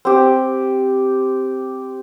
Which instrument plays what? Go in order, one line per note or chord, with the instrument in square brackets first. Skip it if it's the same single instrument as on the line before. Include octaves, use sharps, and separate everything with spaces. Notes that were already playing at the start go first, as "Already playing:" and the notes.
[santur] C4 G4